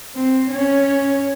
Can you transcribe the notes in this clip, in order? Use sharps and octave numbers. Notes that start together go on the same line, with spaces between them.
C4
C#4